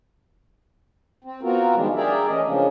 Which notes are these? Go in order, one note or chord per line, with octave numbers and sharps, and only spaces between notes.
C4
B3 C4 F4 F#4 A#4
D#3 F3 G3 G#3 D4
D4 G4 G#4 A#4 D5 E5
E3 A3 C#4 A#4 D#5
C#3 F3 G#3 A#3 C#4 D4